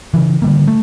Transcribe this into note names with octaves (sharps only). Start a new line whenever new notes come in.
C#3 E3
D3 G3 A#3
A3